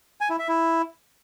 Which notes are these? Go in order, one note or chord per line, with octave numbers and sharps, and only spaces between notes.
G#5
E4
E5
E4